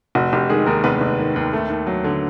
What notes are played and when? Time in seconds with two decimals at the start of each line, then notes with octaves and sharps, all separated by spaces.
0.15 F1 F#4
0.33 F1 G4
0.49 D#3 G#3 G#4
0.66 D#2 A#3 A#4
0.84 F1 B3 B4
1.01 F1
1.19 D#3
1.36 D#2
1.53 A3
1.69 D#2
1.87 F#3
2.04 D3